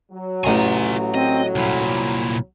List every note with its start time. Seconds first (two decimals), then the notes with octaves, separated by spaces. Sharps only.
0.12 F#3
0.44 A1 F4 G#5 A#5 C6
1.14 C4 D#5
1.55 C2 A#2 E4